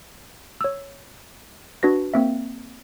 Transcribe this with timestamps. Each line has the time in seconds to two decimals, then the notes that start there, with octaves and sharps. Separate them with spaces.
0.61 C#5 E6
1.83 D4 F#4 B4 A#6
2.14 A#3 C4 E5